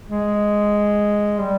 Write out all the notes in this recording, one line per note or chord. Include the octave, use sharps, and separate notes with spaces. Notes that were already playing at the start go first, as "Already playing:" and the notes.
G#3
G3